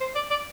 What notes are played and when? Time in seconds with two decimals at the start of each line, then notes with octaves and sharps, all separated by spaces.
0.01 C5
0.15 D5
0.30 D5